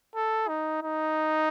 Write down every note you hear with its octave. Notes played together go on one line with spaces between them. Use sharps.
A4
D#4
D#4